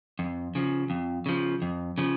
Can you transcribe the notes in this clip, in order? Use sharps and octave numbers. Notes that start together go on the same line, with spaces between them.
F2
C#3 F3
F2
C#3 F3
F2
C#3 F3